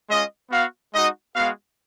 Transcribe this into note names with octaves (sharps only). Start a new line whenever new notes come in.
G#3 C#4 F4 D#5
B3 F#4 F5
G#3 D#4 F#4 D#5
G#3 B3 F#4 F5